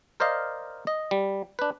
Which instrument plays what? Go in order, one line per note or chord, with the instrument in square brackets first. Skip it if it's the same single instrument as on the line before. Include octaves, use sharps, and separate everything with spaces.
[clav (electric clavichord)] A#4 C5 D5 D#5 F5
D#5
G3
D4 B4